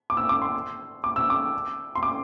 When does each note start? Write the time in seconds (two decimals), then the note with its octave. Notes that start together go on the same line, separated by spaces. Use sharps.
0.10 D6
0.17 E6
0.29 D6
0.42 C6
1.04 D6
1.16 E6
1.30 D6
1.95 C6
2.03 D6